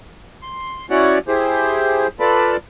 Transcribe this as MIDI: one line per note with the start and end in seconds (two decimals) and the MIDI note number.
0.42 0.86 84
0.90 1.19 61
0.90 1.19 64
0.90 1.19 66
0.90 1.19 73
0.90 1.19 74
0.90 1.19 78
1.28 2.07 64
1.28 2.07 67
1.28 2.07 68
1.28 2.07 72
2.20 2.57 65
2.20 2.57 69
2.20 2.57 71
2.20 2.57 74
2.20 2.57 81
2.20 2.57 83